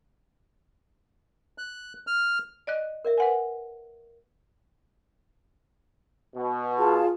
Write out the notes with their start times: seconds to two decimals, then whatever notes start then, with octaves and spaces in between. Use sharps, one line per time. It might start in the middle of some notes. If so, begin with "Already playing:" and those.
1.58 F#6
2.07 F6
2.67 D5 D#5 F#6
3.05 A#4 D5 E5
3.18 B4 F#5 G#5
6.35 B2
6.78 F4 G#4 A5